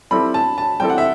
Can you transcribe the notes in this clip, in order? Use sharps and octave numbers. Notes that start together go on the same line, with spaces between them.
G3 C4 E4 A4 B5
A5
A5
G3 C4 E4 A4 G5
F#5
E5